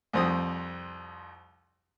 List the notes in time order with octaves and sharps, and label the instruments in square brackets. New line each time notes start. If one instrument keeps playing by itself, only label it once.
[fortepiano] C2 F2 C4 D#6